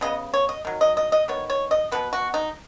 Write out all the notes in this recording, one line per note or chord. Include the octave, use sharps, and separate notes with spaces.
C#3 B3 D#5
C#5
D#5
D#3 F#3
D#5
D#5
D#5
D#3 B3 C#5
C#5
D#5
B2 F#3 B3 B4
F#4
D#4